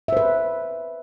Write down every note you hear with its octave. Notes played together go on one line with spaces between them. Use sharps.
B4 C5 E5